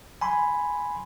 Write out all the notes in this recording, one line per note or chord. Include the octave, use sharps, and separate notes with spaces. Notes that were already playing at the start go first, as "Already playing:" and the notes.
G#5 B5 C6